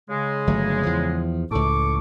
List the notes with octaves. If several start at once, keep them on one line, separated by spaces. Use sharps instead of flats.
C#3 G#3
G1 F#3 A3
E2 F3
C#2 A2 A4 C#6 D6